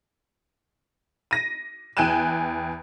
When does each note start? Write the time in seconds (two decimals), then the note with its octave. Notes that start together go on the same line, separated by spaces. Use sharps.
1.31 A#6 D#7
1.97 E2 G5 G#5 F#6 D#7 E7